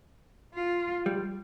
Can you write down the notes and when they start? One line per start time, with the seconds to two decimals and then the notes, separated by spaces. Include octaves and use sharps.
0.55 F4
1.06 G3